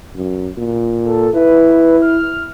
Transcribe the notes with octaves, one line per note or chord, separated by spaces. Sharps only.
F#2
A#2
A4
E4 B4
F6